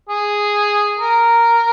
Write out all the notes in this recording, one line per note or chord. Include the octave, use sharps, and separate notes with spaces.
G#4
A#4